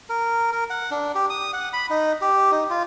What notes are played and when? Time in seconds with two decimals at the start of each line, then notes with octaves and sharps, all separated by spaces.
0.09 A#4
0.52 A#4
0.70 F#5
0.91 D4
1.15 G4
1.30 D#6
1.53 F#5
1.73 B5
1.90 D#4
2.22 G4
2.52 D#4
2.70 F4